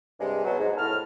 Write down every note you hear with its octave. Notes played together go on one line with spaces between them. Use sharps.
G2 C3 G3 G#3
B2 F#3
G#2
C2 A2 A5 F6